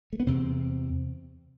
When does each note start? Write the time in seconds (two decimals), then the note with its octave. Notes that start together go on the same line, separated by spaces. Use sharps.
0.13 A3
0.20 B3
0.27 E2 C3 C4